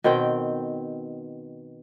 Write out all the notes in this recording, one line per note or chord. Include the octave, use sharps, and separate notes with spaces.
B2 D#3 C4 G5